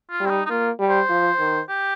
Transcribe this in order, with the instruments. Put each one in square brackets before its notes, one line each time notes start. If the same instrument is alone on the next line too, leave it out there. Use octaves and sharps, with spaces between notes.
[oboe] F4
[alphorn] G3
[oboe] C4
D#4
D#4
[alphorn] A#3 [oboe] F4
[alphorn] G3
[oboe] C5
[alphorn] F3
D#3
[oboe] G4